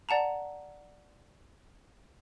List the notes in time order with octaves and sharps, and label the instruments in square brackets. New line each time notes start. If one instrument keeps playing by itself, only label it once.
[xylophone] D5 F#5 A5 A#5